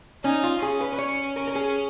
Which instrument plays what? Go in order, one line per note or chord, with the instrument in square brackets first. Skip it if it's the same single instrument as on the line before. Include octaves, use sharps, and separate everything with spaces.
[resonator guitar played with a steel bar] C#4 [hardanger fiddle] D#4
[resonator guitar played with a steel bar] F4
[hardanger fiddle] C#4 [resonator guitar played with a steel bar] G#4
[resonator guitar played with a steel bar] B4
B4
C#5
A#4
A#4
G#4